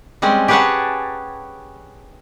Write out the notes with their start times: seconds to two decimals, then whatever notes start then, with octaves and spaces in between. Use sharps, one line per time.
0.22 G3 G#3 C4 C#4
0.48 G4 G#4 B4 C#5 F#5 A5